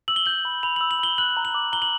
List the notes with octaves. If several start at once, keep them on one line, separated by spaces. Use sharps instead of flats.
E6 F#7
G7
G6 F#7
B5
B5 F7
E6 F#7
F#7
B5 G7
F#6 F#7
A#5
F#7
D6
A#5 G7
F#7